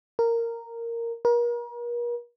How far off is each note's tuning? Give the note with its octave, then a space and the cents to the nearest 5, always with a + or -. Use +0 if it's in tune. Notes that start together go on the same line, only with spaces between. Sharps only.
A#4 -10
A#4 +40